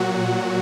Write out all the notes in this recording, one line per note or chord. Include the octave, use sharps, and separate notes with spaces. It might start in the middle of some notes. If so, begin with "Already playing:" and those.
Already playing: A#2 F#3 F#4